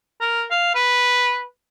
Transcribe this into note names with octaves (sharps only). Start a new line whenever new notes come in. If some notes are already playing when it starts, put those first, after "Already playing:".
A#4
F5
B4